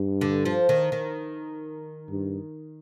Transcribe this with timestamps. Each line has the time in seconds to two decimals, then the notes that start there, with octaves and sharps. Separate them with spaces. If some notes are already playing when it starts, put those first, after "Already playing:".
Already playing: G2
0.21 D3
0.45 F3
0.69 D#3
0.92 D#3
2.10 G2